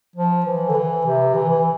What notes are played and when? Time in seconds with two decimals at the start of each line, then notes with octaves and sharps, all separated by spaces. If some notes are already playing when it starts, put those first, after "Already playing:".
0.16 F3
0.46 E3
0.70 D3
0.74 E3
1.05 C3
1.34 E3
1.49 E3